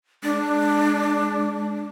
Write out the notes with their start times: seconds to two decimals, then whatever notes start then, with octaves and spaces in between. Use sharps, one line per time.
0.23 G#3 D4